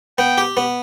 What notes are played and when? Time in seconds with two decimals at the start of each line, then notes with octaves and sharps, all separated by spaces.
0.18 B3 G5
0.38 G4
0.57 B3